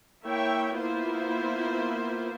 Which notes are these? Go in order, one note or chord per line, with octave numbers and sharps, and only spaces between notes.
A#3 E4 C#5 E5 G5
A#3 B3 E4 F4 C5